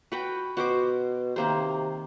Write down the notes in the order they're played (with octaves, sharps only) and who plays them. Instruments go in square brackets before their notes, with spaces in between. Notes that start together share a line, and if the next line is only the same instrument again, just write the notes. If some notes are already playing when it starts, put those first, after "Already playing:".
[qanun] F#4 B4 G5
[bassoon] B2 [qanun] F#4 C5 D6
[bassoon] C3 [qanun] D#3 A#3 C5